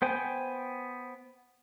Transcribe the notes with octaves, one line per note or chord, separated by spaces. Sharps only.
B3 C5 G5 G#5